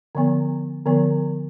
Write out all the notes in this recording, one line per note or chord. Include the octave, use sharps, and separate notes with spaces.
D3 F3 B3
D3 F3 B3